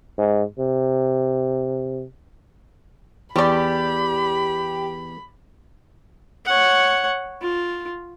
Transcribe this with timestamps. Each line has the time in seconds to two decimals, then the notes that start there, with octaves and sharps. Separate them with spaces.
0.18 G#2
0.59 C3
3.36 E2 G3 G4 D5 B5
6.45 C#5 F#5
7.41 F4